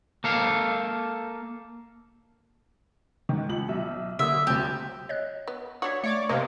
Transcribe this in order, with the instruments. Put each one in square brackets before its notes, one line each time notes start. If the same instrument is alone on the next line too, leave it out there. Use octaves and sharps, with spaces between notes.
[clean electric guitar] A#3 A4 F5
[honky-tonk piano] G#2 D#3
C#2 F#7
B1 E5
[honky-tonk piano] D3 A#3 D#6 [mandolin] E5
[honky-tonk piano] D2 C3 [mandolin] G4
[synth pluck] C#5 D#5 F#6
[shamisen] B3
[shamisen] F#3 D4 F#4 [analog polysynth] C#5 [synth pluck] D6 B6
[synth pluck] A3 [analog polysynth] C#5 D5 D6
[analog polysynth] C3 A#3 [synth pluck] C5 [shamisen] D#5